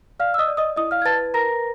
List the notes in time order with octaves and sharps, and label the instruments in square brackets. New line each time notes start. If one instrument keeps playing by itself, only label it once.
[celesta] D5 F5 F6
E6
D#5 D#6
D5
D#5 D#6
E4 D#5 D#6
F5 F6
G#6
B4 A5 A6
A#4 A#5 A#6